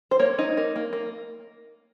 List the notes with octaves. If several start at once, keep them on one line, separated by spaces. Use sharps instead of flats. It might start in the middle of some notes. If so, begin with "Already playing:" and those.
C5
A#3 C#5
D#4
A#3
A#3
A#3